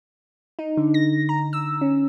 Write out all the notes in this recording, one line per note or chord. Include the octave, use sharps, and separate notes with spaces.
D#4
D3
A#6
A#5
E6
C#4